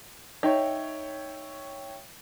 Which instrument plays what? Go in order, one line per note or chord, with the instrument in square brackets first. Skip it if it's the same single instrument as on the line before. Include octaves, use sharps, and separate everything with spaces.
[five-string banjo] D#4 [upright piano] C#5 E5 G5